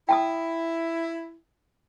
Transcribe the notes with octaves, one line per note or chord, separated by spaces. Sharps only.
E4 G5 A5 D#6